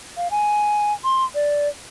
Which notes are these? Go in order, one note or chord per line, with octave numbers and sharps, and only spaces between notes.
F5
G#5
C6
D5